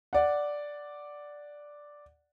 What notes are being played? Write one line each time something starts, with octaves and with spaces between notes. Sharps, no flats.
D5 F#5